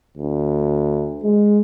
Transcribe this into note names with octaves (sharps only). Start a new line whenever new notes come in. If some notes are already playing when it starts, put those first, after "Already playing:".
D2
G#3